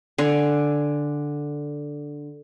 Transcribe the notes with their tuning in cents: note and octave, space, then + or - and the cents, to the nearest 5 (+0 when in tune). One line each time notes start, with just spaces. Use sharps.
D3 +0 G#5 +0